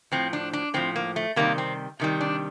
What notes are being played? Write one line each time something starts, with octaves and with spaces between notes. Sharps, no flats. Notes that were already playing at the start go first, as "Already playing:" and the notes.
A2 F3 C4
D4
D4
A2 F3 C4
A#3
A3
C3 D#3 G3 A#3
C4
C3 D#3 G3
D4